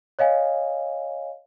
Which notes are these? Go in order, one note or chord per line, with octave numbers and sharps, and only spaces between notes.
C#5 D#5 F5 G#5